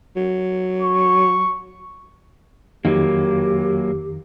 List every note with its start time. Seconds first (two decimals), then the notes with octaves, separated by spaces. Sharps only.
0.17 F#3
0.82 C#6
2.85 F2 D#3 F#3 A#3 G4